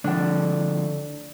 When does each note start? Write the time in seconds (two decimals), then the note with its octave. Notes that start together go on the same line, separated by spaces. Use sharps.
0.04 D3 F3 A3 D4 G5